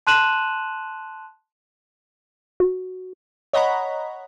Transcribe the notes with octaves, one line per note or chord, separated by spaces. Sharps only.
A5 C6 F#6 D#7 E7 F#7
F#4
C#5 D#5 F#5 A#5 B5